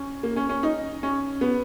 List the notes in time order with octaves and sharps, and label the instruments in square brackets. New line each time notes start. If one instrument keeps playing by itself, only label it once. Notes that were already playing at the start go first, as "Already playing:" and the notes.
Already playing: [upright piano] C#4
A#3
C#4
C#4
D#4
C#4
B3